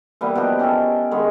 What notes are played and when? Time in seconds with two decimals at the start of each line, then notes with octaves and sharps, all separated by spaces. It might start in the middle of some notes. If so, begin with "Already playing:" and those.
0.21 E3 G3 A#3 B3
0.35 B2 F3 D#4 G4
0.59 C#4 G4 A4 E5
1.11 D#3 G#3 B3 C#5